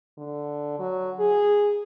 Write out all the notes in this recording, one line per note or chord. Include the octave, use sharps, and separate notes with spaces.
D3
F#3
G#4